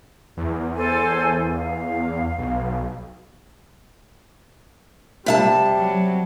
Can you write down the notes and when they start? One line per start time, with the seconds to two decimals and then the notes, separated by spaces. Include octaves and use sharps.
0.37 E2
0.76 A4 C5 G#5
1.55 F5
2.38 B1
5.26 C3 G3 E5 A5
5.76 F#3